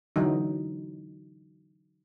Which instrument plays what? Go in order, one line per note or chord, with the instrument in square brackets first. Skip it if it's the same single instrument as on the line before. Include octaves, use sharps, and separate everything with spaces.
[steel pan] D3 E3 F#3 D#4